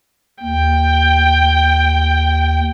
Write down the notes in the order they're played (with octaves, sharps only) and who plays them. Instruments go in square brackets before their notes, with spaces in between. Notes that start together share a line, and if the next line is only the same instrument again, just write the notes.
[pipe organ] D#2 [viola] G5